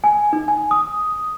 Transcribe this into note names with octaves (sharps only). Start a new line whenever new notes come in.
G#5
D#4
G#5
D#6